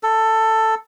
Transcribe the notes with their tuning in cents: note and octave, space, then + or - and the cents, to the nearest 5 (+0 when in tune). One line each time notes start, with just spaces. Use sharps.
A4 +10